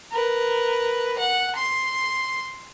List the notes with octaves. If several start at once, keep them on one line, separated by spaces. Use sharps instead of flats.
A#4 B4
F#5
C6